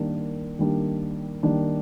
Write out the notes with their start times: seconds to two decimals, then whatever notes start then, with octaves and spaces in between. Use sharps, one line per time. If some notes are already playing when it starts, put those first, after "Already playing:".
Already playing: D#3 G3 A#3 D4
0.59 D#3 G3 A#3 D4
1.43 D#3 G3 A#3 D4